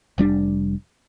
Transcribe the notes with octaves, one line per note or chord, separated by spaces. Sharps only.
F1 G3 C4 D4